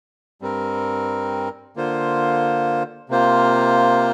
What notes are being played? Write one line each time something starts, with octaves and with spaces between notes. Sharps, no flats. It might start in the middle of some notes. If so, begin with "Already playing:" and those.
G2 G3 C4 A#4
D3 A#3 F4 C5
C3 A#3 F4 C5